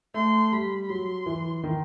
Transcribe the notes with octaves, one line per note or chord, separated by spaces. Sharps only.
A3 C6
G3 B5
F#3 C6
E3
D#3